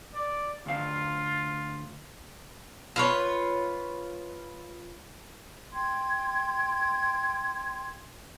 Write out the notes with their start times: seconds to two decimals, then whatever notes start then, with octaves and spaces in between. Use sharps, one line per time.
0.15 D5
0.66 D2 F4 F5
2.96 F4 B4 C#5
5.72 G5 C6 G#6